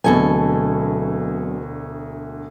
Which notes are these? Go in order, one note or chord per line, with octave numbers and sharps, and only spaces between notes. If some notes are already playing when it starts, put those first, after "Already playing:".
E1 D2 B2 F#3 B3 C4 A4 G#5